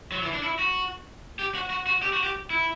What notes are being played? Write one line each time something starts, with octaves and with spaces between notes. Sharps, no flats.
F#3
E3
D4
E4
F#4
G4
F#4
F#4
F#4
G4
F#4
G4
E4